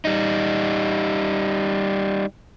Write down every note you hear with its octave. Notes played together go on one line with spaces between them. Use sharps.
G3 D#4